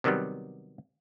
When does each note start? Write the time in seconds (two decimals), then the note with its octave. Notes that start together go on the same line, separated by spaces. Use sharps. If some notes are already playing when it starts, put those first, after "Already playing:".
0.04 C3 D#3 F#3 G3 B3